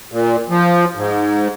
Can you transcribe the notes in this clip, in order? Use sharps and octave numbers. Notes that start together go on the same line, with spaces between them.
A#2
F3
G#2